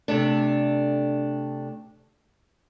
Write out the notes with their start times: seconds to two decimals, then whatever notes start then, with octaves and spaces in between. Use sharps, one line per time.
0.08 C3 A3 D4